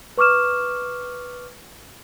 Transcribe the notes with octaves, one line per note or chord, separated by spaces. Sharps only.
B4 C#6 D6 F6 E7